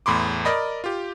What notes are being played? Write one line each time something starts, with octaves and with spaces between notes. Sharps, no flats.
E2 A2 B5 C6 D6
A#4 D5 D#5 B5
F4 G4